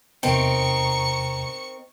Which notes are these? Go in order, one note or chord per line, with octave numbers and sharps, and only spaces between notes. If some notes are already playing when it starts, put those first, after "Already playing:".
E2 C3 C4 D#4 A#4 G5 C#6 C#7